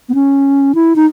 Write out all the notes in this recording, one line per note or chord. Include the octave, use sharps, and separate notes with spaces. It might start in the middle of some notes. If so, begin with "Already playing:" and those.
B3
C#4
E4
D#4